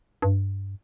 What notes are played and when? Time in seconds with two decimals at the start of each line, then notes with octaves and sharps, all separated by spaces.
0.22 G2